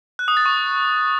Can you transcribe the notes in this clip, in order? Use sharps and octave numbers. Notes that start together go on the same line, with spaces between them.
F#6
D#6
A6
C#6